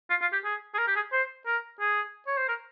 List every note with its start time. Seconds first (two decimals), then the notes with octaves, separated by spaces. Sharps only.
0.10 F4
0.21 F4
0.33 G4
0.44 G#4
0.74 G#4
0.78 A#4
0.87 G4
0.96 G#4
1.12 C5
1.46 A#4
1.80 G#4
2.27 C#5
2.37 C5
2.48 A#4